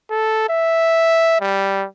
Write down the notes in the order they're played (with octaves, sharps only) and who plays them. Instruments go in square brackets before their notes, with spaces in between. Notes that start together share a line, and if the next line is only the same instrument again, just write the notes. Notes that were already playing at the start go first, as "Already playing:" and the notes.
[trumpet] A4
E5
G3